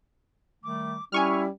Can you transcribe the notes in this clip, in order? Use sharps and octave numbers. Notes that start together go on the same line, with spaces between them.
D#3 G3 A3 D6
G3 C#4 E4 G#5 C#6 F6